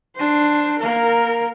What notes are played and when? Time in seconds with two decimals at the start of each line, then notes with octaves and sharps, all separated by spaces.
0.16 D4 C5
0.78 A#3 A#4